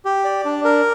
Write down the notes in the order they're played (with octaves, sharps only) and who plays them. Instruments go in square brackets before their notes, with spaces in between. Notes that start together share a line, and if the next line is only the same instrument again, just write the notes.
[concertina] G4
D5
D4
A#4